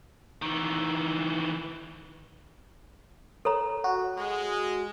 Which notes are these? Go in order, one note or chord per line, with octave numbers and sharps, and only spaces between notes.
D#3 E3
A4 C#5 A#5
F#4
G#3